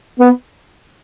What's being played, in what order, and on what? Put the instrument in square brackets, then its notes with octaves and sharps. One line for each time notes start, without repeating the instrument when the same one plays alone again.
[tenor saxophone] B3